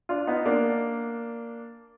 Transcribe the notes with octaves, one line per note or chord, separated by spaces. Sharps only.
D4 F4
B3 D#4
A#3 D4